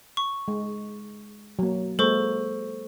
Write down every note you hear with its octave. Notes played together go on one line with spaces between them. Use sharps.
C#6
G#3
F#3 A#3
G#3 A#3 A4 C5 C#6